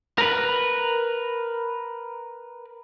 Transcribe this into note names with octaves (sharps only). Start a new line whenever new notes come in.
A#4 B4